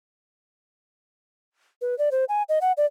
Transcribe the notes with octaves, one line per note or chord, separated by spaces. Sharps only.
B4
D5
C5
G#5
D#5
F#5
D5